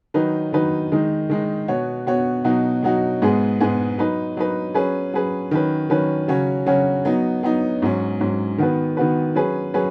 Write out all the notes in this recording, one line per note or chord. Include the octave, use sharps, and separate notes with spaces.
D#3 F#3 D#4 B4
D#3 F#3 D#4 B4
D#3 G#3 D#4
D#3 G#3 D#4
B2 B3 F#4 C#5
B2 B3 F#4 C#5
B2 F#3 D#4 F#4
B2 F#3 D#4 F#4
G#2 G#3 B3 G#4
G#2 G#3 B3 G#4
F#3 D#4 B4
F#3 D#4 B4
F#3 C#4 G#4 B4
F#3 C#4 G#4 B4
D#3 F#3 C#4 B4
D#3 F#3 C#4 B4
C#3 F#3 C#4 F#4 C#5
C#3 F#3 C#4 F#4 C#5
F#3 B3 D#4
F#3 B3 D#4
G#2 F#3 C#4
G#2 F#3 C#4
D#3 B3 F#4 B4
D#3 B3 F#4 B4
F#3 C#4 G#4 B4
F#3 C#4 G#4 B4